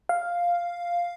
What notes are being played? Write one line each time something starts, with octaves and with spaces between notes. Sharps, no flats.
F5